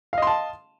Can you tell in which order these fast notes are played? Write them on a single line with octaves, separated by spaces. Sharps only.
F5 D#5 C6 A5